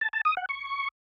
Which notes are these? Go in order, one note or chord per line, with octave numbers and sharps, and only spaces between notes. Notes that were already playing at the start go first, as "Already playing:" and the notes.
A5
A5
D#6
F#5
C#6